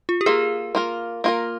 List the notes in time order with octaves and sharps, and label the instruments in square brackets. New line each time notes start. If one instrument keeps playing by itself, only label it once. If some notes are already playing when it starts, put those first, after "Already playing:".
[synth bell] F4
G4
[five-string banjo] A#3 F4 A#4 [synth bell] G#4
[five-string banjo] A#3 F4 A#4
A#3 F4 A#4